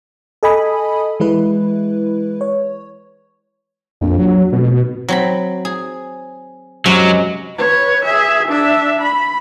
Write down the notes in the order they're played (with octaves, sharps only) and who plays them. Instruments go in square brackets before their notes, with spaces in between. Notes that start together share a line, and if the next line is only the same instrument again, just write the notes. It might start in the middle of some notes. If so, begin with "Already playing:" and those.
[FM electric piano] A4 D#5 G#5 B5 D#6
E3 G#3 E4 B4
C#5
[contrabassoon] A#1 [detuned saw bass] F2
[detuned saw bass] F#3
[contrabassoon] F1 [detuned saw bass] B2
[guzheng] F#3 C4 B5
G#4
[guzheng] F#2 C3 G#3 [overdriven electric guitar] F#3
[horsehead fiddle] B4 C#5
G#4 E5
D4 E5
B5